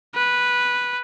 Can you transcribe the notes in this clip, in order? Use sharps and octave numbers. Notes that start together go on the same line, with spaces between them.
B4